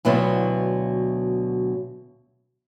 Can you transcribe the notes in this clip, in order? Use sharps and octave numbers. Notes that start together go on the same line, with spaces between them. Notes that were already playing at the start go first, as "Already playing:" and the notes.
D2 B2 F#3 B3 E4 F4